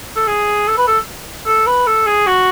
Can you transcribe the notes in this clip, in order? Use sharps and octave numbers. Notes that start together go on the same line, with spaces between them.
A4
G#4
A4
B4
A4
A4
B4
A4
G#4
F#4